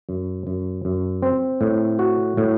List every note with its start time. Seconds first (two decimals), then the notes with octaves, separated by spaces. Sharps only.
0.09 F#2
0.47 F#2
0.85 F#2
1.22 C4
1.61 A2
1.99 F#4
2.37 A2